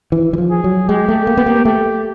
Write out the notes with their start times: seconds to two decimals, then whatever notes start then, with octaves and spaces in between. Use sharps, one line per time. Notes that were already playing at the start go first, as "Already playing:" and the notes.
0.12 E3
0.33 E3
0.38 F3
0.50 G#4
0.64 F#3
0.89 G#3 G4
1.08 A3
1.27 A#3
1.37 B3
1.46 A#3
1.65 A3 G4